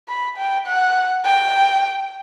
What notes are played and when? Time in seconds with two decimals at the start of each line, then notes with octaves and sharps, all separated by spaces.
0.08 B5
0.37 G5
0.67 F#5
1.25 G5